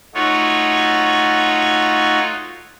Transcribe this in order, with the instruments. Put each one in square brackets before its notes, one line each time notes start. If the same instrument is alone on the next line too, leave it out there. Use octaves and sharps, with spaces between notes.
[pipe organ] A3 D#4 F4 F#4 C#5